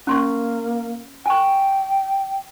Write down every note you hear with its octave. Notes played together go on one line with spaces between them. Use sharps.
A#3 C#4 C6 C#6
G5 G#5 C#6